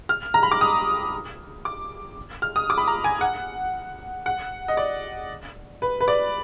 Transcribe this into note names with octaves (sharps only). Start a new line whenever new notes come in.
F6
A#5
B5
D6
D#6
D6
F6
D#6
D6
B5
A#5
G#5
F#5
F#5
D#5
D5
B4
B4
D5